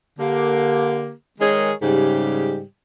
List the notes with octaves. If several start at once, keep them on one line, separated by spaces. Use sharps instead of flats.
D3 A#3 G4
D#3 G#3 G#4 A#4 C#5 D#5
G#2 C#3 G3 G4